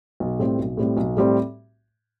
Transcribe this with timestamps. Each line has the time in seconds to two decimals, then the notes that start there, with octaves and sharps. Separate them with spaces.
0.20 B1
0.39 A2 G3 C4
0.59 B1
0.77 A2 G3 C4
0.97 B1
1.17 A2 G3 C4